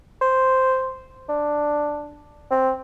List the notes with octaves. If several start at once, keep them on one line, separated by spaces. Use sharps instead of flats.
C5
D4
C4